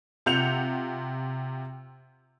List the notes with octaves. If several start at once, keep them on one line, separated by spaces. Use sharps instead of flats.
C3 F4 F#5 G6 C#7 F7